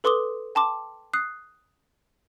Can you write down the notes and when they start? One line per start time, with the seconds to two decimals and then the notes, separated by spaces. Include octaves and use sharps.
0.04 A4 B4 C6 D6 D#6 G7
0.55 G5 A5 C6 D6
1.14 D#6 F#6 C7